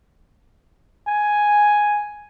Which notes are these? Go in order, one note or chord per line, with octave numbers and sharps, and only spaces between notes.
G#5